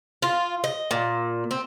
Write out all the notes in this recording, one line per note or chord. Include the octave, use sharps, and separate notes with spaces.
F4
D#5
A#2
C4